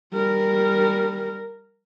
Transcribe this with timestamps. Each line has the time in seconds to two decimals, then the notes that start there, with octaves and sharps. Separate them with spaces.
0.13 G3 A#4